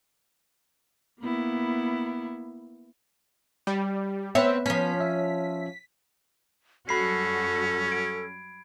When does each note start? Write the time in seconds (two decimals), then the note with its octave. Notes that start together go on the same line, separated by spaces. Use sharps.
1.20 A#3 B3 E4
3.67 G3
4.35 B3 C4 B4 C#5 E5
4.66 F3 C#4 B6
5.00 E5
6.89 F#2 G3 C#4 F#4 A4 B5 C7
7.88 G#6 D7